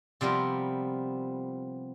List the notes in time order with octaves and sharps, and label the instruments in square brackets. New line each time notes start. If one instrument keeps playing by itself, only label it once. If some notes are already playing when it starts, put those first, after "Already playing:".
[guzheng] C3 F3 G3 B3 A#4